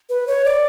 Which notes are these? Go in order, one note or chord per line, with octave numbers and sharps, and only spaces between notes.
B4
C#5
D5